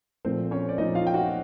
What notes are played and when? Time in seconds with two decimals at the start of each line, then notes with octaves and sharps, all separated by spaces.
0.25 A#2 F3 A3 C4 C5
0.51 C#4 C#5
0.69 D5
0.78 A#2 F3 A3 D#4 D#5
0.95 F4 F5
1.07 G5
1.14 F#4 F#5